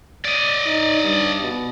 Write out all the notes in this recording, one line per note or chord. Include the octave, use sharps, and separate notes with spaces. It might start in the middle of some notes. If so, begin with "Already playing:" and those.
D5 D#5
D#4
G2
B2